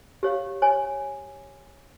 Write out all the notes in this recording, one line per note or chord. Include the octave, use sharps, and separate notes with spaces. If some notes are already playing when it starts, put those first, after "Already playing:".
G4 C#5 F5
C#5 G#5